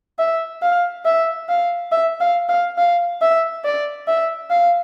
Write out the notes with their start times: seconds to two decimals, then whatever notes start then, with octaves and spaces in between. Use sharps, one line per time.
0.19 E5
0.62 F5
1.05 E5
1.49 F5
1.92 E5
2.20 F5
2.49 F5
2.78 F5
3.21 E5
3.64 D5
4.07 E5
4.51 F5